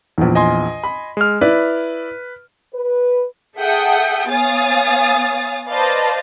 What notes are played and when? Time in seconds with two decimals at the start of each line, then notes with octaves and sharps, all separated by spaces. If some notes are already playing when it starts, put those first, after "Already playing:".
0.18 A#1 E2
0.35 D#5 G#5 C6
0.84 B5
1.17 G#3 F6
1.41 E4 B4 D5
2.74 B4
3.58 G#4 A4 E5 F#5 G5 D#6
4.30 B3 C#5 F5 G#5 D#6 A6
5.70 B4 C5 D5 D#5 F5 A5